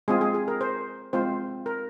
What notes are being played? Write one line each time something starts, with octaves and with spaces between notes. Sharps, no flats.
G#3 C4 F4 G#4
G#4
G#4
A#4
C5
G#3 C4 F4 C5
A#4